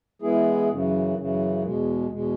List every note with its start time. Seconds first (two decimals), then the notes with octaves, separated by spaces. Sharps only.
0.22 E3 G#3 B3 E4 G#4
0.69 F#2 C#3 E3
1.16 F#2 C#3 E3
1.62 E2 B2 G#3
2.09 E2 B2 G#3